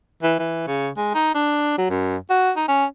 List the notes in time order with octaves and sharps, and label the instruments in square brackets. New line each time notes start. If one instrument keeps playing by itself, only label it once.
[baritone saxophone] E3
E3
C#3
G#3
D#4
D4
F#3
F#2
F#4
D#4
C#4